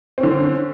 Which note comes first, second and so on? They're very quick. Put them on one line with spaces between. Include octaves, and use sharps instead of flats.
C4 C#4 D3